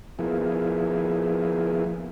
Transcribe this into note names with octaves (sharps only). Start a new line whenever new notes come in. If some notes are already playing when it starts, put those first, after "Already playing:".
F3 A#3 B3 E4 G#4